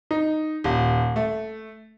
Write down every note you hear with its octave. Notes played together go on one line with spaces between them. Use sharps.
D#4
D#1
A3